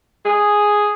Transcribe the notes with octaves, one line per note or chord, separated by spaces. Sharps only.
G#4